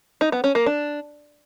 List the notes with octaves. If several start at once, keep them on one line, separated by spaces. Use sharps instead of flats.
D#4
B3
C#4
A#3
D4